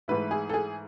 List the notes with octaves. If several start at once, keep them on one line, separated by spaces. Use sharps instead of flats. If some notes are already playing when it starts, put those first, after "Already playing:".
G#2 E3 A3 E4 B4
G#4
A4
G#4